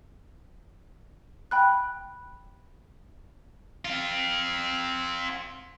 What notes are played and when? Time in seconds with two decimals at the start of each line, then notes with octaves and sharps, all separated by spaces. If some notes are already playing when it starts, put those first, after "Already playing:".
1.51 G5 B5 F#6
3.85 C4 F4